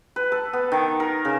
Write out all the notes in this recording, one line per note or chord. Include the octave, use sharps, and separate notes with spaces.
B4
A4
B3
D#3
A#4
C#3